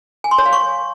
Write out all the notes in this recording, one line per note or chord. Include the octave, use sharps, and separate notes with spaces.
G#5
C6
C#5
F5
C#6